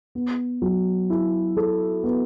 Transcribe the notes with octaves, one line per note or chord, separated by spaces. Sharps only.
B3
F#3
E4
A4
B3